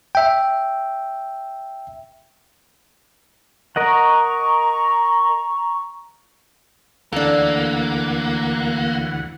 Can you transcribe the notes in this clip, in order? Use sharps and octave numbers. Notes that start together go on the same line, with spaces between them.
E5 G5
A#4 D#5 F#5 A#5 C#6
D2 E3 A#3 D4 A4 F#5